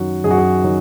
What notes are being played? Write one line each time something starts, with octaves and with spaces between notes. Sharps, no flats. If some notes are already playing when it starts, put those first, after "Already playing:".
Already playing: F#2 D#3 F#3 F#4
F#2 G#4
F#4
G#4
D#3 F#3